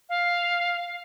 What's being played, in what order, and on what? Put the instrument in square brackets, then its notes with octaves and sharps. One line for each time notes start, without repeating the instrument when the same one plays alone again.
[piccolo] F5